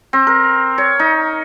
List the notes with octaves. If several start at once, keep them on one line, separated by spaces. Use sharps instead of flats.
C4
A#4
C#5
D#4